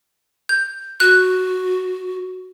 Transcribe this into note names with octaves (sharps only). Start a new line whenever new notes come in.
G6
F#4 F#6